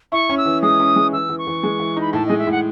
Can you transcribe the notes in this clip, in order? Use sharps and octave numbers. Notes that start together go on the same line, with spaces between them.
E4 C#6
C#4
E6
E3
G#3 D#6
C#4
G#3
E3 E6
E3
C#6
E3
G#3
E3
D#4 B5
A2 A5
G#3 D#5
E5
A2 F#5